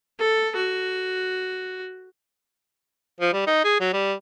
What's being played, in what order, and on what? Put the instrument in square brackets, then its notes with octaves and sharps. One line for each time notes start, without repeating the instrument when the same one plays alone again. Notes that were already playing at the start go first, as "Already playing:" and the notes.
[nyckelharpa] A4
F#4
[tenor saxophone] F3
G3
D#4
G#4
F#3
G3